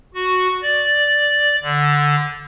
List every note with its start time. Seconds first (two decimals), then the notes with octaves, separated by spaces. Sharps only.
0.15 F#4
0.62 D5
1.63 D3